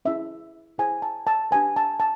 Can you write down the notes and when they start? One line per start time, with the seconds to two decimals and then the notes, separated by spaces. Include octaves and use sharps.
0.05 C#4 E4 G#4 E5
0.78 E4 G#4 C5 G#5
1.02 A5
1.27 A5
1.51 D4 G4 B4 G#5
1.76 A5
2.00 A5